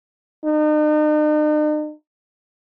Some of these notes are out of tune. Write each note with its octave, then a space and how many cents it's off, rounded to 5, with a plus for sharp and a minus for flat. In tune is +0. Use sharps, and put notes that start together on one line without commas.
D#4 -45